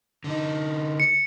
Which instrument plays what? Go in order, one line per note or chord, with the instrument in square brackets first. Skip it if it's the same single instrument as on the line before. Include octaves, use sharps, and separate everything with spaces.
[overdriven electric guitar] D3 D#4
[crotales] C#7